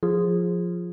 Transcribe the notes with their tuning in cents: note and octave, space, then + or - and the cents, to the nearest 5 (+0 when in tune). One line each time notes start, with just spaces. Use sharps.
F3 +15 F4 -15 G#4 -10